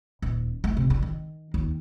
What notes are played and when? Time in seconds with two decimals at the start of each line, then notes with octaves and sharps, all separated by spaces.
0.22 D#1
0.64 A3
0.77 C3
0.90 D4
1.03 D#3
1.54 D#2